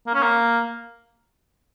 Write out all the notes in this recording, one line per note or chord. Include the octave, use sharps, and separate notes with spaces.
A#3
C#4
A#3